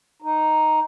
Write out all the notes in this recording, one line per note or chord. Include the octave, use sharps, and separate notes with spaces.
D#4